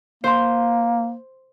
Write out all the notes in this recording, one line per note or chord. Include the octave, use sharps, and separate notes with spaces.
A#3 C5 C6